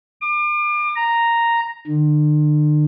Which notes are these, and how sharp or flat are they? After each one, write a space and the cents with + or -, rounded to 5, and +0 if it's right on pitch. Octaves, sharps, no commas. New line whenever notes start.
D6 +40
A#5 -5
D3 +40